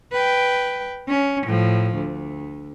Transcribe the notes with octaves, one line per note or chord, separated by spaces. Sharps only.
B4 G5
C#4
A2 F3
D2